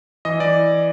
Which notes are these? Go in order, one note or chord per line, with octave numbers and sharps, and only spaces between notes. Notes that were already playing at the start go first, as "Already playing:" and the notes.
E3 D#5
E3 D5